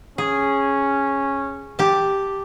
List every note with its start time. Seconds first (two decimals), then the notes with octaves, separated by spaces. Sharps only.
0.18 C#4 G#4
1.79 G4 A5